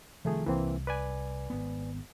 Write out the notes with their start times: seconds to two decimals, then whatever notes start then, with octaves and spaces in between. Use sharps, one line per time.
0.25 C2 D#3 F3 A3 G#4
0.46 C2 E3 A#3 C4
0.87 B4 D5 G#5
1.50 G#1 B3